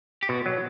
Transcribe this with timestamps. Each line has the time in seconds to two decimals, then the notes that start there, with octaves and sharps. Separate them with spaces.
0.23 G4
0.28 B2 F#4
0.46 F#3